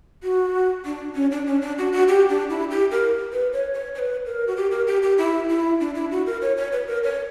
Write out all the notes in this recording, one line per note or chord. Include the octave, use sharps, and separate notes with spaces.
F#4
D4
C#4
D4
C#4
D4
F#4
F#4
G4
D4
E4
G4
A#4
B4
C#5
C#5
C#5
B4
A#4
F#4
G4
A#4
G4
G4
E4
E4
D4
E4
F#4
A#4
C#5
C#5
B4
A#4
C#5